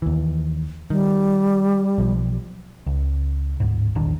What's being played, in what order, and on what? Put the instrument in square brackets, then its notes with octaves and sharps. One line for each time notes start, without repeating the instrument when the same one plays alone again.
[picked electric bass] D#2 E3
[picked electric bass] D#3 [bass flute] G3
[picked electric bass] B1 F3
C#2
D1 G#2
E1 A#1 D#3 D4